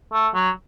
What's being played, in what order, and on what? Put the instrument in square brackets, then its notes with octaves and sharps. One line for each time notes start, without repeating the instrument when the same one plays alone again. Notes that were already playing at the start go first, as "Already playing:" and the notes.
[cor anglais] A3
F#3